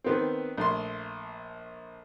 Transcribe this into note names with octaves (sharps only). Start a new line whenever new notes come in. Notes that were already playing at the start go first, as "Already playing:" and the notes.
D#3 B3 C4
A#1 A3 C6